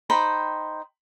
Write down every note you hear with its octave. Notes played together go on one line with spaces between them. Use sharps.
D#4 C5 G5 B5